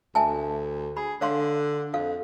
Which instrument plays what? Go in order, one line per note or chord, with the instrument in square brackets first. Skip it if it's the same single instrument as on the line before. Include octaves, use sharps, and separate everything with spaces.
[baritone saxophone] D2 [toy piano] E5 G#5 A5
[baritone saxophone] G#4 [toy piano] B5
[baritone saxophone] D3 [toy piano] C#5 F5 C6
[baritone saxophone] F2 [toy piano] A4 F5